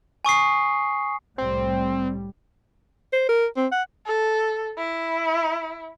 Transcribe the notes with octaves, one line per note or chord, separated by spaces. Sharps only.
G#5 C#6 D#6 C7
C2 A2 G3 C4
C5
A#4
C4
F#5
A4
E4